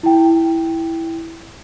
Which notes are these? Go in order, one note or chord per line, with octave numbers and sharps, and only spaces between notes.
E4 G5